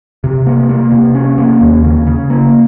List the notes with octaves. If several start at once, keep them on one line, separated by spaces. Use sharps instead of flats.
C3
A#3
A#3
C3
C#4
A#3
D#2
C#3
C#3
A#3